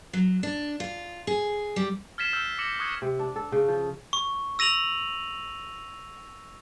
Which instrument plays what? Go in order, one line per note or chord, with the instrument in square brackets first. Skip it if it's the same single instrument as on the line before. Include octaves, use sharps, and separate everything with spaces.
[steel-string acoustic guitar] F#3
D4
F4
G#4
G3
[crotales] F6 G#6 A6 B6 C7 E7
E6 F6 G6
D6 A#6 C#7 E7 F#7
C#6 D#6 F#6 G#6 C#7
[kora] C3
D4
A4
C#3
F3
[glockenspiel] C#6
E6 A#6 D#7 F7 F#7